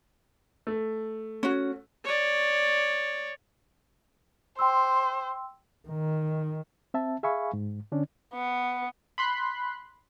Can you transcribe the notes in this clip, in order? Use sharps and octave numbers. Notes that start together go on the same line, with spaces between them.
A3
C#4 F#4
C#5 D5
C5 G5 C6 E6
D#3
C4 E5 A5
G#4 E5 F5 G#5 B5 C#6
G#2
D3 C#4 D4
B3
B5 C6 F#6